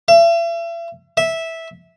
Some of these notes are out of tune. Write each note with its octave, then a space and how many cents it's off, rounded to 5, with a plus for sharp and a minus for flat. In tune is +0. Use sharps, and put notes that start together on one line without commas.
E5 +40
E5 -10